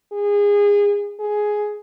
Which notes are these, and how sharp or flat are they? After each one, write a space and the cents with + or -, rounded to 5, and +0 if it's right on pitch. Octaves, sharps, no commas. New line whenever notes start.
G#4 -25
G#4 +10